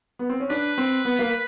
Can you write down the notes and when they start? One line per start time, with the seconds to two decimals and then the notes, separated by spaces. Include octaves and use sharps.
0.19 B3
0.29 C4
0.40 C#4
0.50 D4 B4
0.78 C4
1.05 B3
1.19 A#3